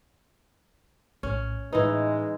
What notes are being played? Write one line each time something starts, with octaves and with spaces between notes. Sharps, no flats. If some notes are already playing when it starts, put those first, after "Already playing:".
A#1 A2 C#4
A2 E3 G#3 D#4 B4